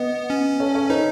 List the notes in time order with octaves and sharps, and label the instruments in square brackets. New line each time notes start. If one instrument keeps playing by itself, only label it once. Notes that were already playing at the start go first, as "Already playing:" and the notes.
Already playing: [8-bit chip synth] B3 [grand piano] B4 D#5
[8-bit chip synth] C#4
[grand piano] A4 C#5
A4 C#5
[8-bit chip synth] D#4 [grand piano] B4 D#5